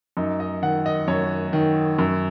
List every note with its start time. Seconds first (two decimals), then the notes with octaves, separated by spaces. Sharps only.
0.17 F#2 D#4
0.40 D#5
0.62 D#3 F#5
0.86 D#5
1.08 F#2 C#5
1.53 D#3
1.99 F#2